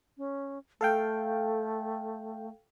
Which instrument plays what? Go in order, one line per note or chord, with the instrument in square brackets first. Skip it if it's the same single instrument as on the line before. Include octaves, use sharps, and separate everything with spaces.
[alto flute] C#4
[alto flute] A3 [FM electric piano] A4 F5 G5